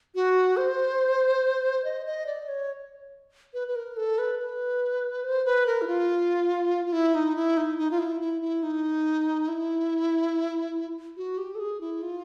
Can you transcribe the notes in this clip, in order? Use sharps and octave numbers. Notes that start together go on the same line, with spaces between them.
F#4
C5
D#5
D#5
D5
C#5
B4
B4
A#4
A4
B4
B4
C5
B4
A#4
E4
F4
F4
E4
D#4
E4
D#4
D#4
F4
E4
E4
E4
D#4
E4
F#4
G4
A4
G#4
E4
F4